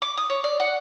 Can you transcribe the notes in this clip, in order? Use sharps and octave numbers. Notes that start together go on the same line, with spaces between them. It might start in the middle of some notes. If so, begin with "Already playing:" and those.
D6
D#6
C#5
D5
F#5